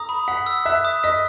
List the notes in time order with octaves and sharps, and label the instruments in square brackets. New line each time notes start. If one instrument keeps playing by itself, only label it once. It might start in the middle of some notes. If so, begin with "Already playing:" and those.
Already playing: [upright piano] A#5 [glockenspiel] D#6
[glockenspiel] B5
[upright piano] F#5 [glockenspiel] B6
[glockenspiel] E6
[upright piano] E5 [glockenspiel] F#6
[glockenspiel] D#6
[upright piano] D#5 [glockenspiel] B6